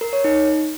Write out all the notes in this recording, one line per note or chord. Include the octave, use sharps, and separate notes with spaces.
A#4
C#5
D#4